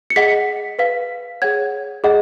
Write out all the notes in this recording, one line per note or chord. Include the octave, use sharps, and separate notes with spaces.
C#7
G#4 D#5 F#5 B6
B4 F5 B6
G#4 C#5 F#5 G#6
G#4 D#5 F#5